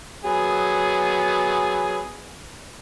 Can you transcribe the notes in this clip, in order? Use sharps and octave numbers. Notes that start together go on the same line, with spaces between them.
F#3 B3 G#4